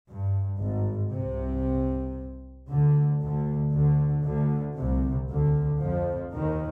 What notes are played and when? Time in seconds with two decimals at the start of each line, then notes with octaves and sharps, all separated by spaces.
0.09 G2
0.60 G#1 G#2
1.12 C2 C3
2.69 D2 D3
3.21 D2 D3
3.73 D2 D3
4.25 D2 D3
4.77 C2 C3
5.29 D2 D3
5.81 F2 F3
6.33 D#2 D#3